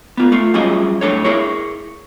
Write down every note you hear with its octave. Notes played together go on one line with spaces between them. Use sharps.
B3 F4
A3 F4
F#3 G3 C#4 F4 G#4 D#5
A2 D4 A4 C#5
E4 G#4 A#4 C#5